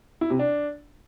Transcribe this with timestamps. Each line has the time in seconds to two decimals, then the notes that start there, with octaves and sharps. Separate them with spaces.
0.21 E4
0.30 C3
0.39 D4